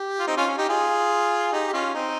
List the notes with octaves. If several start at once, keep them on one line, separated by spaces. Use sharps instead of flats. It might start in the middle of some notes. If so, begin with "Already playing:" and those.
Already playing: G4
F4
C4 D#4
C#4 F4
C#4
D#4 G4
F4 G#4
D#4 G4
G4
C#4 F4
C4 D#4